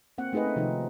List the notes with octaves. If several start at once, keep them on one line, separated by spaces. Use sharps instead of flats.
A#3 C4 F#5
A3 D#4 G#4 B4 D#5
C4 C#4
C3 D#3 F3 D#4